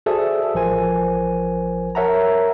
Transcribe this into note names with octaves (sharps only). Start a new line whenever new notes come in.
F#4 G#4 A4 C5 D5 E5
A1 F3 A#4 C5 G#5
A#4 C#5 E5 F#5 A5 A#5